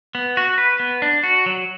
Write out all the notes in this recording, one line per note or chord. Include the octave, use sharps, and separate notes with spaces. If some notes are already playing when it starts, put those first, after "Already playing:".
B3
F#4
B4
B3
D4
F#4
F#3